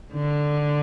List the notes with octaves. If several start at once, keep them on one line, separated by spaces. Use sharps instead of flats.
D3